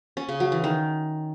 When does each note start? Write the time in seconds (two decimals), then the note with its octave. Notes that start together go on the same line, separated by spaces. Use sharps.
0.17 C#4
0.29 C#3
0.40 F#3
0.52 E3
0.64 D#3